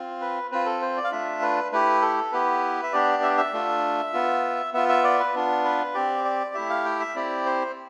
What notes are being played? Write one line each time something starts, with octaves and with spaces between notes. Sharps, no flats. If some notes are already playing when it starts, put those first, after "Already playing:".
Already playing: C4 F4
B4
C4 F4 B4
A4
C5
D5
F5
A3 D4 F4 E5
B4
A3 E4 G4 B4
A4
B3 E4 G4 B4
E5
B3 D4 G4 D5
E5
D5
E5
A3 D4 F4
B3 F4
B3 F4 E5
E5
D5
B4
B3 D4 F4
B4
C4 G4 D5
D5
A3 E4 G4 E5
F5
G5
E5
C4 E4 G4 D5
C5